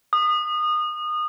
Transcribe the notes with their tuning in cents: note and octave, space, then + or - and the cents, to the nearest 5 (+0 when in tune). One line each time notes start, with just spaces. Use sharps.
D#6 -25